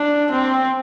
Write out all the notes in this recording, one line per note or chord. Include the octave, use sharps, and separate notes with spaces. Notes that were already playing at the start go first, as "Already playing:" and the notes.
Already playing: D4
C4